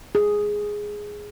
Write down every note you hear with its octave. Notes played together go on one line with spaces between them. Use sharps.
G#4